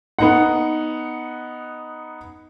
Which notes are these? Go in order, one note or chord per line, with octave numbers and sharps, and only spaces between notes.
B3 D#4 F#5